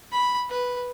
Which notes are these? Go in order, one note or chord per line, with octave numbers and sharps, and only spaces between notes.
B5
B4